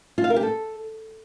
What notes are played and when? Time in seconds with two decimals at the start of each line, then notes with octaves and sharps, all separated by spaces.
0.18 F4
0.24 F5
0.30 A#4
0.36 G4
0.43 A4